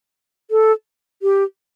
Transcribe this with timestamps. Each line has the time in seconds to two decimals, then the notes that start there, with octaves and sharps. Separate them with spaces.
0.51 A4
1.22 G4